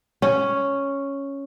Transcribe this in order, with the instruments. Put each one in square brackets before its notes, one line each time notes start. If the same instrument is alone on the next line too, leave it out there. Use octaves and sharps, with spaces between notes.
[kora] C#4